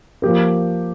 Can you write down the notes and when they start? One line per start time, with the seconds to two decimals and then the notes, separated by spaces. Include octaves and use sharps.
0.22 F3 A#3 G4 A#4